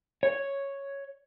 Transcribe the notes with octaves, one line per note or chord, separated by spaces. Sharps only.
C#5